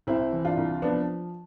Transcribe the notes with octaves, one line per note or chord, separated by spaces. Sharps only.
C2 C4 E4
E3
D4 F4
C2
F3 B3 D4